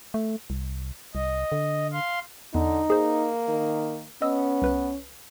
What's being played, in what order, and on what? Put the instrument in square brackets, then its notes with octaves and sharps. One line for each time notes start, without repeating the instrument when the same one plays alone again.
[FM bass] A3
C2
[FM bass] C2 [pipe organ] D#5
[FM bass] D3
[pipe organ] F5 C6
[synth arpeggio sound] E2 [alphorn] D3 [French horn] D#4
[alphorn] A#3 [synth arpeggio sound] G#4 C5
[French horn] D#3
[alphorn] B3 [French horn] C#4 [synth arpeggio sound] D#5 D#6 E6
[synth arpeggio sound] C2 B4 F#6